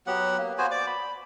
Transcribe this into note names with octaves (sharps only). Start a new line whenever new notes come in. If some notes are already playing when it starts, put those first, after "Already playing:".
F#3 B3 G4 F#5
A#3
B3 F#4 C5 G#5
D5 D6
B5